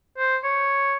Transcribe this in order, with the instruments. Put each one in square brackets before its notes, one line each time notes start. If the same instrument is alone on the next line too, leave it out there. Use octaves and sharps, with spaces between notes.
[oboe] C5
C#5